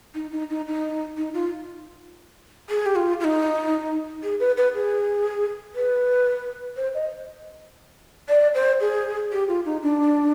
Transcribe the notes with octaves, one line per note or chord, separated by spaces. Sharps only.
D#4
D#4
D#4
D#4
D#4
F4
G#4
G4
F4
F4
D#4
G#4
B4
B4
G#4
B4
C5
D#5
D5
C5
G#4
G4
F4
D#4
D4